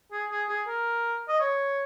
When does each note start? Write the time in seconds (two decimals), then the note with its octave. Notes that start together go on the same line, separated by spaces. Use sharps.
0.12 G#4
0.31 G#4
0.49 G#4
0.67 A#4
1.28 D#5
1.40 C#5